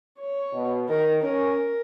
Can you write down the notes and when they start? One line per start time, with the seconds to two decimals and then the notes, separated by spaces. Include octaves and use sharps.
0.19 C#5
0.53 B2
0.89 D#3 A#4
1.22 C#4 A#4